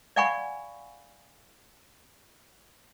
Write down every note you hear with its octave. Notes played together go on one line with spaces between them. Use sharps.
D5 F5 F#5 G#5 B5 C#6